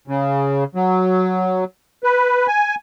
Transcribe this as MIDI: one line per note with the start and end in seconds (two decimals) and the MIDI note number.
0.08 0.64 49
0.75 1.64 54
2.04 2.47 71
2.47 2.75 80